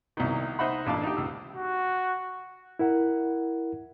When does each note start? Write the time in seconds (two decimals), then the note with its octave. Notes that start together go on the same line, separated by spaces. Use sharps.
0.17 C2 B2 D#3
0.59 D#4 C5 D#5 E5 F#5 B5
0.86 A1 A#2 D4 F5 A5
1.03 D#4 G4
1.17 C#2 E6
1.55 F#4
2.79 E4 A#4 F#5